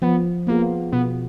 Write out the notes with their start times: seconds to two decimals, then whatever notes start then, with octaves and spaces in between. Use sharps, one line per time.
0.02 F3 B3
0.47 A#3 B3 F4 G#4
0.92 B2 B3